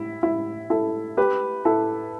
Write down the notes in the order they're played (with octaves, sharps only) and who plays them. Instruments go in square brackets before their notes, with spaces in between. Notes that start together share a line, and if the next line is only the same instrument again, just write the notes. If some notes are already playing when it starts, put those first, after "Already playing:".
Already playing: [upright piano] E4
E4
E4 A4
G4 B4
E4 A4